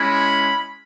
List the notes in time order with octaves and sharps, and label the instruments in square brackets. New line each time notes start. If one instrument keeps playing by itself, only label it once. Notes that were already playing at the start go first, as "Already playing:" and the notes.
Already playing: [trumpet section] G#3 C#4 E4 B5